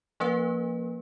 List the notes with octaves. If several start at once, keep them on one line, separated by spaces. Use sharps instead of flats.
F3 A#3 C#4 B4